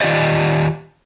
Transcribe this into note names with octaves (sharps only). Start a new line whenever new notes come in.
D#3 G#3 F4 G4 D5 D#5